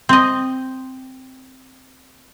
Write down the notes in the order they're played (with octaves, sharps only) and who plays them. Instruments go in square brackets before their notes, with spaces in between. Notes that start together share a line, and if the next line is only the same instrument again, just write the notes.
[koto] C4 D#5